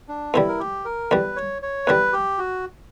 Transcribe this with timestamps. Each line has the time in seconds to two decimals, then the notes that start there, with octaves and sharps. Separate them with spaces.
0.08 D4
0.34 E2 D3 G3 E4
0.48 A#4
0.59 G4
0.85 A#4
1.11 E2 D3 G3 B4
1.36 C#5
1.62 C#5
1.87 E2 D3 G3 B4
2.13 G4
2.38 F#4